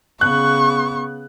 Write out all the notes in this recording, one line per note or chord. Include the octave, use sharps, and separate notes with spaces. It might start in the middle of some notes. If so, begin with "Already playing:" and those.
C#3 B3 C#6 F#6